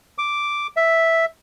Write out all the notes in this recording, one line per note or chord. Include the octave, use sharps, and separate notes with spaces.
D6
E5